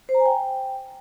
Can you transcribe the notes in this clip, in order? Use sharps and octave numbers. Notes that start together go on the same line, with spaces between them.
C5
A#5
G#5
G5